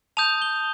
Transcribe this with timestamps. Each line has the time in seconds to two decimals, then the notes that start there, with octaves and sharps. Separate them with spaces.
0.17 A5 D#6 G6 F7
0.42 G7